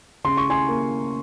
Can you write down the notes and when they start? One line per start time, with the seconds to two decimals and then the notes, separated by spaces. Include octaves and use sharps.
0.24 C#3 C6
0.37 C#6
0.50 G#5 C6
0.68 A#3